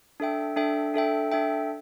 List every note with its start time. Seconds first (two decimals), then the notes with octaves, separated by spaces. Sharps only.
0.20 D4 A4 E5 G5
0.56 D4 A4 E5 G5
0.94 D4 A4 E5 G5
1.32 D4 A4 E5 G5